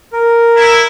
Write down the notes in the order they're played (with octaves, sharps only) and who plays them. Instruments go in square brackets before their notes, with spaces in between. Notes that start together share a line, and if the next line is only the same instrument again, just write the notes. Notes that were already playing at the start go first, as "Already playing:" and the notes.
[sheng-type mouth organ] A#4
[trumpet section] E4